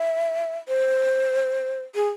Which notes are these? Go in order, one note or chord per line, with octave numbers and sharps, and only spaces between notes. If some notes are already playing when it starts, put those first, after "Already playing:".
Already playing: E5
C5
G#4